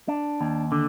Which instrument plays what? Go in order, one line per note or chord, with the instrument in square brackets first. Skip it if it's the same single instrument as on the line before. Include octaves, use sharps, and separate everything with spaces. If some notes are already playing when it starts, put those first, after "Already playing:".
[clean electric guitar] D4
D#2
D3